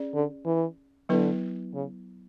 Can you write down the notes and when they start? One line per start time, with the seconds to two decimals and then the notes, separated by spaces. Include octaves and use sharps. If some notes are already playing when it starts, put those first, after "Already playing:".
Already playing: C#4 G#4 D5
0.14 D3
0.46 E3
1.09 D3 F#3 B3 E4 B4
1.74 C#3